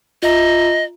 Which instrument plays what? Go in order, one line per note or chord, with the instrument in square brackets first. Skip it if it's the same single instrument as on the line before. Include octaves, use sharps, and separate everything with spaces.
[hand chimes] F4 E5 A#5 [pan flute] D#5